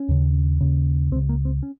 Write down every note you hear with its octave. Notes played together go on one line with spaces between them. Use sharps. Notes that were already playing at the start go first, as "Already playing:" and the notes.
Already playing: C#4
D#2 C#3
D#2 C#3
C#2 C#3 C4
A#3
C4
C#4